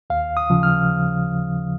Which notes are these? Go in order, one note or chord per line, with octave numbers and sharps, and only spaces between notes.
D#2 F5
D#6
C#3 F3
F6